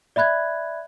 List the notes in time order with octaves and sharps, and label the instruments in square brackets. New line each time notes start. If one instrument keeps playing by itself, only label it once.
[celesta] D5 E5 B5 F#6 G#6